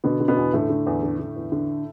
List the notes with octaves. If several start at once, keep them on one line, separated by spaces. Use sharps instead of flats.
B2 D3 B3
D3
B2 B3
E2
A2 D3 A3
D3
E2
D3
D3
E2
D3